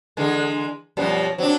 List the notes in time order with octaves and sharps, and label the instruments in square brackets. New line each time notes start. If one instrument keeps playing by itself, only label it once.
[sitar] D3 E3 G#3
[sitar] F#2 B2 F3 [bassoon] G3
[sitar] F#3 D4 [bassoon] C4